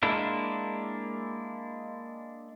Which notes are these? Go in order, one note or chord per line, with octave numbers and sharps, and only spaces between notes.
G#3 A#3 D4 E4